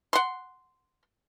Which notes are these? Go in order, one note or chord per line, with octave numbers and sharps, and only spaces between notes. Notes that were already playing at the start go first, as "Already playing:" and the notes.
F#5 C6